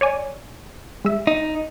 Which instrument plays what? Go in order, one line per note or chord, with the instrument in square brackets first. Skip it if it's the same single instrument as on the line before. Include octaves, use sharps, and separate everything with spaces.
[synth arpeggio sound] C#5 D5 G#5
G#3 E5
[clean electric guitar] D#4